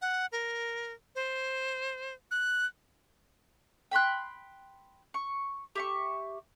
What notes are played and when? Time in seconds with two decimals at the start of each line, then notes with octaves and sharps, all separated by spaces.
0.02 F#5
0.32 A#4
1.15 C5
2.31 F#6
3.91 G5 B5 C6 F#6
5.14 C#6
5.75 G4 E5 C#6